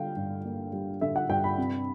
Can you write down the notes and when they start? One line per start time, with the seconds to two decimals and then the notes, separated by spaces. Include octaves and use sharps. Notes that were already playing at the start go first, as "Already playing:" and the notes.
Already playing: D3 G3 F5 G5
0.16 G2
0.45 A#3
0.73 G3
1.01 D3 E5
1.16 F#5
1.29 G2 G5
1.44 B5
1.58 C3